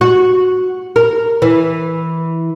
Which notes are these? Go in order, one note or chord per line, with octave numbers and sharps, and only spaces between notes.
F#4
A#4
E3